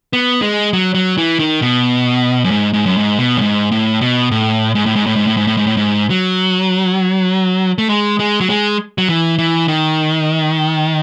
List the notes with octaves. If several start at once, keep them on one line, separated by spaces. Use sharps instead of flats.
B3
G#3
F#3
F#3
E3
D#3
B2
F#2
G#2
G#2
F#2
G#2
B2
F#2
G#2
A2
B2
A2
G#2
A2
G#2
A2
G#2
A2
G#2
A2
G#2
A2
G#2
F#3
A3
G#3
G#3
F#3
G#3
F#3
E3
E3
D#3